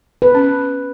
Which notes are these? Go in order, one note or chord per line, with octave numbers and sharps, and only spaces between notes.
B4
C#4